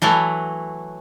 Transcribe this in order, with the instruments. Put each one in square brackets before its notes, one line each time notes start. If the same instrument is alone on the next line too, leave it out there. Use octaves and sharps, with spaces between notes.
[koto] E3 F#3 A3 E4